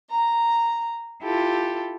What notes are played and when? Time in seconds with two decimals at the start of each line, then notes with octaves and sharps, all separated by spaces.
0.11 A#5
1.22 E4 F4 G4 A4